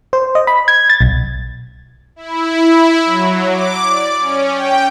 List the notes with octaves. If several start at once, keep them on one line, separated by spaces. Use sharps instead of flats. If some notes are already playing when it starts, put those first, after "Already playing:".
C5
D#5
B5
G#6
A6
B1
E4
E4
F#3
D6
D5
C#4
G5